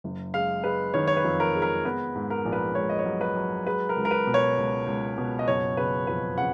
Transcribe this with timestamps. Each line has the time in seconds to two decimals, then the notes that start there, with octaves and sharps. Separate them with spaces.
0.04 F#1
0.34 G#3 F5
0.64 G#3 B4
0.94 D#3 C#5
1.07 C#5
1.17 B4
1.24 F2
1.40 A#4
1.55 G#3
1.62 A#4
1.85 B3 B4
2.15 G#2
2.30 A#4
2.45 A#1
2.53 B4
2.75 G#2 C#5
2.89 D#5
2.99 C#5
3.06 F#3
3.21 B4
3.36 F#3
3.66 G#3 B4
3.89 A#4
3.96 C#2
4.05 A#4
4.11 B4
4.27 B2
4.34 C#5
4.57 C#2
4.87 C#2
5.18 B2
5.39 D#5
5.48 F#1 C#5
5.77 C#3 B4
6.07 F2 B4
6.37 C#3 F#5